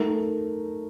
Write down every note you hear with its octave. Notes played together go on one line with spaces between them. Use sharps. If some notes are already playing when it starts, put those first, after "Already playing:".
Already playing: A3 D#4 A#4